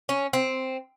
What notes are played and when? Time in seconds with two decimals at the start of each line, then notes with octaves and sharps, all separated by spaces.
0.09 C#4
0.33 C4